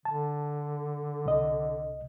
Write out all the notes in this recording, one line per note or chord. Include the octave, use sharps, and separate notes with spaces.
D3 A5
C2 C3 D#5